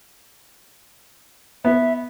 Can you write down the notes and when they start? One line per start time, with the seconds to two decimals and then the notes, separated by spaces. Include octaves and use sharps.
1.65 B3 E5